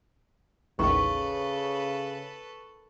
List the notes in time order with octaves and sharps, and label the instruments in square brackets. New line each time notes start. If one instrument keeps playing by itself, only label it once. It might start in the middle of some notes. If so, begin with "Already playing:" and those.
[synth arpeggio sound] A1 D#2 [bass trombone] C#3 [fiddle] A4 B4 [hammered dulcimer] C#6